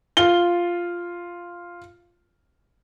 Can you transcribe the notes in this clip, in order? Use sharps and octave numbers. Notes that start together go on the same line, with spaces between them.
F4 G7